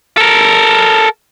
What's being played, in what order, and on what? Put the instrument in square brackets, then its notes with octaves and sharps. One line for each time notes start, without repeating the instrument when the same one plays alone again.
[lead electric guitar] A4 A#4